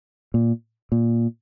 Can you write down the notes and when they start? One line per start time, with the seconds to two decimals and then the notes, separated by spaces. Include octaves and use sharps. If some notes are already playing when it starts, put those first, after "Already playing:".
0.34 A#2
0.92 A#2